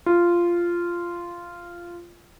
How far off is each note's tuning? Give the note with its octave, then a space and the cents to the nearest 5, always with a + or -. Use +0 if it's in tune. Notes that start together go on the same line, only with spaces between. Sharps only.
F4 -10